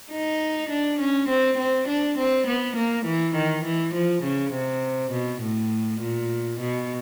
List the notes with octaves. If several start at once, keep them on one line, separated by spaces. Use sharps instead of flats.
D#4
D4
C#4
C4
C4
D4
C4
B3
A#3
E3
D#3
E3
F3
C#3
C3
B2
A2
A#2
B2